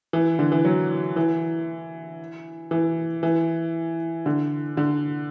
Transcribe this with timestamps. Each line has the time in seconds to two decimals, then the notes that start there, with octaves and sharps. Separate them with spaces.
0.13 E3
0.39 D3
0.52 E3
0.65 F#3
1.16 E3
2.71 E3
3.23 E3
4.26 D3
4.77 D3